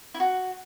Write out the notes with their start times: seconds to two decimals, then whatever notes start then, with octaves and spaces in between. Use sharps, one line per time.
0.14 E4
0.20 F#4